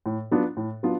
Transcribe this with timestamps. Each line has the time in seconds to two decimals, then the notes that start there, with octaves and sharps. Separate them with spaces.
0.06 A2
0.31 F#3 B3 D4 F4
0.57 A2
0.83 F#3 B3 D4 F4